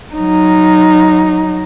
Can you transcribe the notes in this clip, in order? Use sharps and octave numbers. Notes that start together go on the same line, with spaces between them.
F#3 D#4